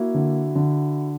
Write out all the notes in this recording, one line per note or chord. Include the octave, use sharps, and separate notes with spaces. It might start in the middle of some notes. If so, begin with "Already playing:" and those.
Already playing: A#3 E4 F#4
D3
D3